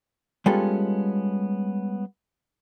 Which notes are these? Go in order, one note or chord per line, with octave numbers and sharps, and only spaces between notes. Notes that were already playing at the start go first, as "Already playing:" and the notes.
G3 G#3 B3 C#4 F4 A4